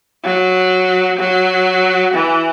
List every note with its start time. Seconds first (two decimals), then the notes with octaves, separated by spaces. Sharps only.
0.24 F#3
1.19 F#3
2.14 E3